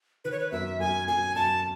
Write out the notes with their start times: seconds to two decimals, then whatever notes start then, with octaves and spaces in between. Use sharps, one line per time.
0.25 D#3 B4
0.32 C#5
0.39 B4
0.52 F#2 E5
0.80 F#2 G#5
1.07 F#2 G#5
1.35 F#2 A5